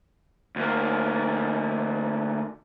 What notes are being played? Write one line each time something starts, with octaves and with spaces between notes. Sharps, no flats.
D2 A#3